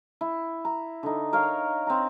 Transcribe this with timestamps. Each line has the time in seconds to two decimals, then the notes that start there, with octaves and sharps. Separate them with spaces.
0.21 E4
0.65 A#5
1.03 D3 D#4
1.33 A#4 C#5 F5
1.87 C4 A#5